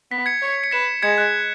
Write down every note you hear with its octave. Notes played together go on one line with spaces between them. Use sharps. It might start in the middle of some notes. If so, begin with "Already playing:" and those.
B3 B6
G#6 C#7
C#5
C#7
B4 B6 E7
G#3 G#6 C#7
F#6